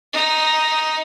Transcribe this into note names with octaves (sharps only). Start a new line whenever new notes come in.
D#4